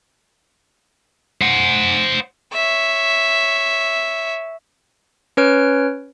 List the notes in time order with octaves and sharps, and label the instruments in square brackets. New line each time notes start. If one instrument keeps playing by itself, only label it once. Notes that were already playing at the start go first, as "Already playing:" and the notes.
[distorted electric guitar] C5 F#5
[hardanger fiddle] C#5 E5
[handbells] C#4 B4 C#5 F6 D7